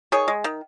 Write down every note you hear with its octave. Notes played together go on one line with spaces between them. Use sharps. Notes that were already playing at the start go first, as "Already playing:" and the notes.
D#3 G#4 C#5
G#3
D#3